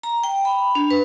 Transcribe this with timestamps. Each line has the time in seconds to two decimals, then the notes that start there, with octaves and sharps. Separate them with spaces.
0.03 A#5
0.24 G5
0.45 B5
0.75 D4
0.91 B4